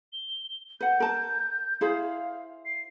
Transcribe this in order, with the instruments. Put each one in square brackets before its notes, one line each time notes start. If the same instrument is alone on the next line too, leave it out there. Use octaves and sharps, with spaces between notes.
[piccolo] G7
[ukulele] B4 F#5 [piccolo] G6
[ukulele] A#4 A5
[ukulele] E4 G#4 C5 [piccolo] F5
[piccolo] C7